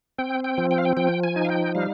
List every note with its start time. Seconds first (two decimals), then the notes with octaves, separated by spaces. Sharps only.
0.19 C4 G5
0.44 G5
0.58 F3
0.71 G5
0.78 F5
0.85 G5
0.97 F3 G5
1.24 G#5
1.36 D#4
1.45 F5
1.49 G5
1.75 G3 F5